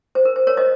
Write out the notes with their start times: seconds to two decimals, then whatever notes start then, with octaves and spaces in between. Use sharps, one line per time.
0.15 C5
0.25 A#4
0.36 C5
0.47 A#4 C#5
0.57 C5 D#5